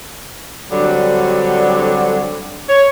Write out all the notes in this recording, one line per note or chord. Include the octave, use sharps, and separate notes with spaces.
D3 F#3 G3 C4 D4
C#5